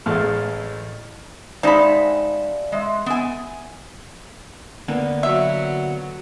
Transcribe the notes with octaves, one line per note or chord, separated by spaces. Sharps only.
A1 G#3 A3 F5 A5 F6
C3 G#3 D#4 D5 F5 G#5 A5 B5
G#3 D#5 E5 C6
B3 G#5
D3 A#3 B3
F#3 E5